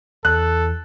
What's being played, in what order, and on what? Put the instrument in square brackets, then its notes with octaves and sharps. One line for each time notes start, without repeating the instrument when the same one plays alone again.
[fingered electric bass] E2 [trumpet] A4 [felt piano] F#6